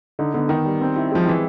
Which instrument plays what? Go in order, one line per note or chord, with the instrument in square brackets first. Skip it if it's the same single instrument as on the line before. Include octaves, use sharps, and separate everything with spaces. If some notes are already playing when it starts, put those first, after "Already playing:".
[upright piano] D3 [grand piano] D#4
[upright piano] D3 [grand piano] B3
[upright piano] D#3 [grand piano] D#4
[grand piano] G3
C4
E4
[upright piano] F3 [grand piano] G#3
[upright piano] E3 [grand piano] E4